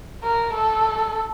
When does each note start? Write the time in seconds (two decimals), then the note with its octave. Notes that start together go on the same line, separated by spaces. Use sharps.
0.23 A#4
0.53 A4